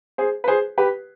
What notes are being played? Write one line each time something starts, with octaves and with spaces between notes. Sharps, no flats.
G#4 C5
B4
G#4 C5
G4 B4